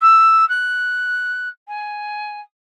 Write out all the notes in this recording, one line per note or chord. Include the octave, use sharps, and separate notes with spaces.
E6
F#6
G#5